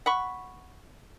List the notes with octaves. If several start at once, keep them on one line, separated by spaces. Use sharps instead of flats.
F#5 B5 C#6